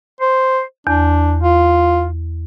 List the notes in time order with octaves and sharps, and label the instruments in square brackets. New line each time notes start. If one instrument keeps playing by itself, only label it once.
[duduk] C5
[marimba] E2 [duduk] D4
[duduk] F4